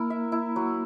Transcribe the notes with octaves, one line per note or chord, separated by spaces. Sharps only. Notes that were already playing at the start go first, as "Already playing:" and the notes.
Already playing: A#3 E4 A#4
E5
E4
F#3